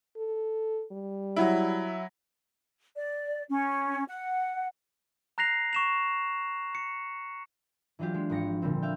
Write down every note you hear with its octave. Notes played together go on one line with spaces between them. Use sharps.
A4
G3
F#3 E4
D5
C#4
F#5
A#5 F#6 A#6 C7 F7
C#6 E7 F7
C#7
E3 F#3 D4 F4 G4
G#3
G#1 F3 A#6 C#7
A#2 D3 G3 C4
E5 F5 G5